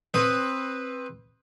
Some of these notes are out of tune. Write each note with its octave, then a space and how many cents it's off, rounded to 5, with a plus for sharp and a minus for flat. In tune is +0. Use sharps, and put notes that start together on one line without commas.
C4 +15 B4 +0 D#6 +0